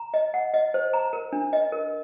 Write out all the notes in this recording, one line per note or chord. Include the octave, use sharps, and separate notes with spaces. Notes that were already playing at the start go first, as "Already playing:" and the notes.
Already playing: A#5
D#5
F#5
D#5
C5
A#5
A#4
D4
D#5
A#4